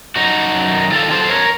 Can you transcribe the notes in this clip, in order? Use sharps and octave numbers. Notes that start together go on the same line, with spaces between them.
F#2 D#4 F#4
F#2
F#2
D#3
D#3 F4 A4
F#3 A4 C5
C5
F2 A#4 C#5